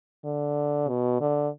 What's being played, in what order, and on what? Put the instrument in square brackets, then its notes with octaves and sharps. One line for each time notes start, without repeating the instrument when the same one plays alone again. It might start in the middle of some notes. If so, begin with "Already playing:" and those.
[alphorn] D3
B2
D3